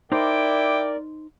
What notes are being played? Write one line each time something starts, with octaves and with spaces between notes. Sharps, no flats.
D#4 E4 A#4 C5 D5 G5 D6